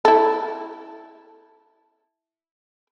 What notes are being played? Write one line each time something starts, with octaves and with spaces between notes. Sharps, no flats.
E4 A4